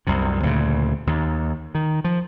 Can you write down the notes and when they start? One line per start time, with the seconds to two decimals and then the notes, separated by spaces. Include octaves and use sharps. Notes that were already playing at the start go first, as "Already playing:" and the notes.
0.07 C2 F#2 C3
0.43 D2 A#2 C#3
1.07 D#2 D#3
1.75 D#3
2.04 F3